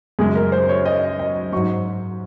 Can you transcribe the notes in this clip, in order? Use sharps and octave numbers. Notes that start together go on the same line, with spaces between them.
F#2 C#3 G#3 G#4
A#4
C5
C#5
D#5
D#5
G#2 F#3 C#6